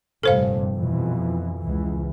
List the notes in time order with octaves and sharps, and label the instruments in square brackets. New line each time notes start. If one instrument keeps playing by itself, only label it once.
[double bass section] F1 G2 A#2 [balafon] A4 C5 F5
[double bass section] F2 B2 E3
C#2 E3